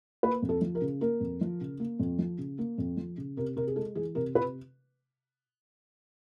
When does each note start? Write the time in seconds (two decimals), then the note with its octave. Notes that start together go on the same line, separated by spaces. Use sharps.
0.23 A#3 B4
0.42 F2
0.49 A4
0.61 F3
0.75 A#4
0.81 C#3
1.01 A#3 A#4
1.20 F2
1.41 F3
1.61 C#3
1.80 A#3
1.99 F2
2.19 F3
2.38 C#3
2.59 A#3
2.78 F2
2.97 F3
3.18 C#3
3.37 C3 A#4
3.56 C3 A#4
3.67 G#4
3.76 G#3 A4
3.95 E3 G#4
4.15 C3 A#4
4.35 C3 B4